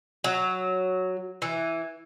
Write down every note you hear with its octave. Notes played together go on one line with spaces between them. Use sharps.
F#3
E3